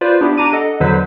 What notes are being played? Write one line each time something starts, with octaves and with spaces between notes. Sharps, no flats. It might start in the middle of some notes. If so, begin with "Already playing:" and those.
F4 B4 C5 D5
B3 D4 E4 G4
D4 A#5 D6 D#7
A4 D#5 F#5
E2 D3 F#3 B4 C5 B6